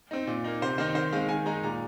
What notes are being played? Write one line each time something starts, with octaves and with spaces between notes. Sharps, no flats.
C4 D#4
A#2
A#3 D#4
C3 C5
D#3 C4 D#4 C5
D#3 C5
G#3 C4 D#4 F5
D#3 G#5
G#3 D#4 A#5
A#2 A#5